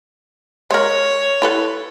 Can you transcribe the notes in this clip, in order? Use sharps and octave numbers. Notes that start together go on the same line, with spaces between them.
G#3 A#4 C#5
E4 A4 B4